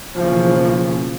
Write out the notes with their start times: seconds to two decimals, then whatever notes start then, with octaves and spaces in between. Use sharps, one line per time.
0.15 B1 C#3 E3 F3 A#3 C#4